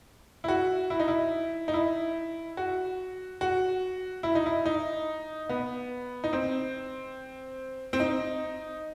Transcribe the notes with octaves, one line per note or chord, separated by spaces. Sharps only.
E4
F#4
E4
D#4
E4
D#4
E4
F#4
F#4
E4
D#4
E4
D#4
B3
D#4
C4
C4
D#4